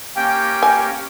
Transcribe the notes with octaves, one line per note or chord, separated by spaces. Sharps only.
A#3 C#4 G4 G5
G#5